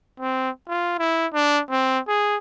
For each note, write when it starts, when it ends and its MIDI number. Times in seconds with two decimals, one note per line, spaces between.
0.20 0.50 60
0.68 0.96 65
0.99 1.27 64
1.33 1.61 62
1.70 1.99 60
2.08 2.38 68